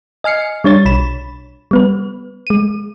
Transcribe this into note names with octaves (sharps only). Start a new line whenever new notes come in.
D#5 G#5 F6 C7 C#7
G3 D4 C#5 A6
B1 B5 E7
G3 B3 B4
G#3 D#7